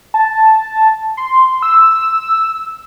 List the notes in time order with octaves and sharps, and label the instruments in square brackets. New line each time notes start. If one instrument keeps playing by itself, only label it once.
[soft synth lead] A5
C6
E6